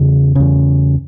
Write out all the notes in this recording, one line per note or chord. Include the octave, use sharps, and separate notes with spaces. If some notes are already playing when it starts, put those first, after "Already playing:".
Already playing: E2 C#3
E2 C#3